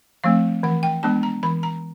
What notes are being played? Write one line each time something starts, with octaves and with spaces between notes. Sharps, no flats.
F3 A3 C4 F5
E3 F#5
G5
G#3 B3 D4 A5
A#5
E3 B5
A#5